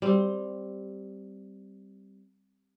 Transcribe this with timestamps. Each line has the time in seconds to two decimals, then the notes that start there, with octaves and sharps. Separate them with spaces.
0.02 G3 C4